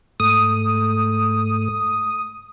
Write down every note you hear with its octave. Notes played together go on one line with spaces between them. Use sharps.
G#2 A3 D#6